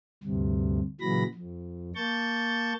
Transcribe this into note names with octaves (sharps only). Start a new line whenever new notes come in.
D2 G2 C3
A#2 C#3 E3 F#3 B5 A#6
F2
A#3 A5 C#6 G6 A6